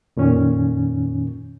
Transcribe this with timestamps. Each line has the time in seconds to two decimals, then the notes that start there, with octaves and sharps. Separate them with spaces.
0.17 F2 A#2 D#3 C#4